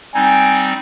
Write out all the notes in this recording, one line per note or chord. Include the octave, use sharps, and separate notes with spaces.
G3 C4 D#4 G#5